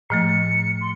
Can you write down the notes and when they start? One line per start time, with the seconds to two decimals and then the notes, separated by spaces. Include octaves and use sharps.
0.10 A2 F3 A3 C#7
0.81 C6